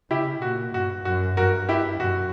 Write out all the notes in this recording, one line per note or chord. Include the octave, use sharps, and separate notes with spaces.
C#3 E4 G4
A#2 F#4
G2 F#4
F#2 F#4
G2 F#4 A#4
E4 G4
F#2 F#4